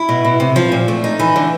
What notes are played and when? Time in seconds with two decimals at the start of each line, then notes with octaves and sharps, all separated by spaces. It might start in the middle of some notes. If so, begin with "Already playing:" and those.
Already playing: E4
0.09 B2
0.25 B2
0.40 C3
0.56 F3
0.72 A#2
0.88 A3
1.04 D#4
1.19 E3
1.36 D3